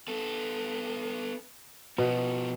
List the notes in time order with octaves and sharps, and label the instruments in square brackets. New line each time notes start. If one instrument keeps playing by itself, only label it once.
[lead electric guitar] B3 A4
[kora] B2 [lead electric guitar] F3 B3